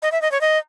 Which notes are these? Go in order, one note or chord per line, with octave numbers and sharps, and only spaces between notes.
D#5
E5
D#5
C#5
D#5